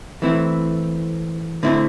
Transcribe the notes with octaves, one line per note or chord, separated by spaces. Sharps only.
E3 A3 C4 E4
D3 A3 C4 E4